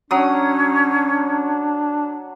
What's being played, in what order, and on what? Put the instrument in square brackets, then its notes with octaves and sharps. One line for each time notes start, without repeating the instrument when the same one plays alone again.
[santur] F#3 D#6 [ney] C#4 [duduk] D4